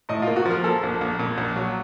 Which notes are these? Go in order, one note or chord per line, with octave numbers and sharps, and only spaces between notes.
A2 D#5
F4
A#3
F#4
F3 A#4
A#3 A4
A#1
A#1
A#2
A#1
F#3